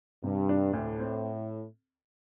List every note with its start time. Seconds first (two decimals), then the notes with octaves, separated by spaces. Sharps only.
0.23 G2 C3
0.49 D4
0.73 D2 A2
0.99 C4